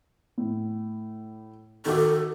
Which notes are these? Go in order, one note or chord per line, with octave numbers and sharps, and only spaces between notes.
A2
D#3 F#4 A4 D6